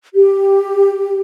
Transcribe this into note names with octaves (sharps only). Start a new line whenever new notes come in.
G4